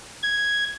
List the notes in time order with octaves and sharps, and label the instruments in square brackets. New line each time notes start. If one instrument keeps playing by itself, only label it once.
[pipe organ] G#6